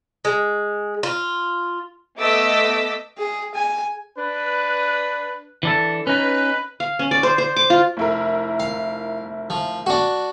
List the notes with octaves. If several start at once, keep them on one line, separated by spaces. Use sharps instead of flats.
G#3
F4
A3 B3 D#5 D6 E6 B6
G#4
G#5
D4 B4
E3 D4 A4
C#4 D#4 B4
F5
C#4
D5
C5
C5
D6
F4
F1 E4 A#4
F5
F3
D4 F#4